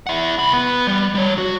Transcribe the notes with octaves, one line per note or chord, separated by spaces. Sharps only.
E4 F#5
C2 B5
B3
G3
G3 C#5
F#4